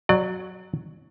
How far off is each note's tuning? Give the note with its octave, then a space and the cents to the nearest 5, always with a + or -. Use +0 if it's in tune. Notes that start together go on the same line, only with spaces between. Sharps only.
F#3 +0 D5 +35